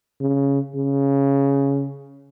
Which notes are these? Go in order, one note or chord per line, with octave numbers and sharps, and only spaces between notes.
C#3
C#3